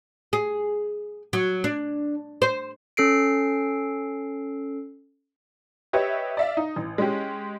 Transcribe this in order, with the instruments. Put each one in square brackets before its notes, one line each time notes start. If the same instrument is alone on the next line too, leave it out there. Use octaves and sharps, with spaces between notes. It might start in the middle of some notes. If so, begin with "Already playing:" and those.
[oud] G#4
F#3
D4
C5
[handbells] C#4 A4 C7 D7
[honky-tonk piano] G4 B4 C#5 D#5 E5
D5 E5 F5
D#4
A1
G#3 C#4 G4